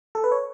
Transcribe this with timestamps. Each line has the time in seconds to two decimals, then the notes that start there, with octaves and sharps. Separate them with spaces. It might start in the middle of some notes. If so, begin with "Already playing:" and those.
0.15 A4
0.24 B4
0.32 C#5